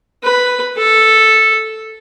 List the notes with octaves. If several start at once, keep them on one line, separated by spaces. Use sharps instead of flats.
B4
A4